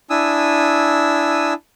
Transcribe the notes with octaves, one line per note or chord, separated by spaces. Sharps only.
D4 E4 G#5 D#6 E6